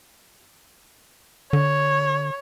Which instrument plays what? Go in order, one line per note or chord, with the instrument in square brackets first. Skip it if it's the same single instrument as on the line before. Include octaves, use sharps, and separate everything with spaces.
[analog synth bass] D3 [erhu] C#5